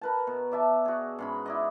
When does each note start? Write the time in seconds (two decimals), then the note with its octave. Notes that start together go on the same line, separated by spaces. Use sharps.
0.01 A#4 B4 A5
0.27 B2
0.52 D5 E5 A5
0.85 F#4 G#4
1.19 G#2 C#4 B5
1.46 E4 D5 D#5